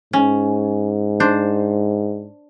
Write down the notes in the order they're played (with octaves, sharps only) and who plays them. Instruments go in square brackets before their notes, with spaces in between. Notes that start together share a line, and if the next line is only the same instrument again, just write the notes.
[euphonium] G#2 [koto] C#4
[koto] D4 C5